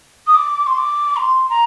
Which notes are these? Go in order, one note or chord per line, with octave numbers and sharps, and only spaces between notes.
D#6
D6
C6
D6
A#5
C6
A#5